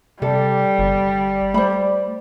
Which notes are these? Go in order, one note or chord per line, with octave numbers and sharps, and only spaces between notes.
C3 G3 A4 D5
G1
A3 C5 D5 B5